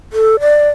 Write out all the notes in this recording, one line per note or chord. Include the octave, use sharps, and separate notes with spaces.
A4
D5